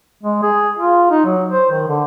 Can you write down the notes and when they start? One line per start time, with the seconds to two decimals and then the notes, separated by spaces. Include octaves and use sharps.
0.23 G#3
0.43 G#4
0.79 F4
1.11 D#4
1.25 F#3
1.49 C5
1.71 D#3
1.88 D3